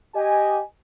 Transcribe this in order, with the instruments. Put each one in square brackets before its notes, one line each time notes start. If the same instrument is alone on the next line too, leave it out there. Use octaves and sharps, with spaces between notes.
[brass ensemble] G4 D#5 G#5